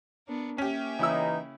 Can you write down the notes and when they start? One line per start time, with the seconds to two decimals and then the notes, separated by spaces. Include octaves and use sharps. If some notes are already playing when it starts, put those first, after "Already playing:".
0.27 B3 D4 A#4
0.58 A#3 C#4 G4 E5 G5
0.99 C#3 E3 D#4 E4 E6